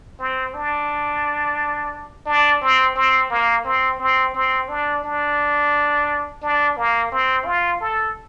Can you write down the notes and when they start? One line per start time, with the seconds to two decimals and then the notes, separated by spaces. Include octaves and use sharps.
0.19 C4
0.54 D4
2.26 D4
2.61 C4
2.96 C4
3.30 A#3
3.65 C4
4.00 C4
4.35 C4
4.69 D4
5.04 D4
6.43 D4
6.77 A#3
7.12 C4
7.46 F4
7.81 A4